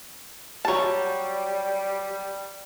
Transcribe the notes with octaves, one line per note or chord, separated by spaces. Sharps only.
F#3 G3 A5